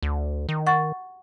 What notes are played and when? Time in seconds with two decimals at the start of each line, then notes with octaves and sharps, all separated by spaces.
0.02 D2
0.49 D#3
0.67 F#5 C#6 A6